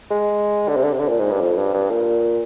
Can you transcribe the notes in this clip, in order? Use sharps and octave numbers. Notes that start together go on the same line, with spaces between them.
G#3
D3
C3
D3
C3
D3
A#2
G#2
G2
F2
G2
G2
A#2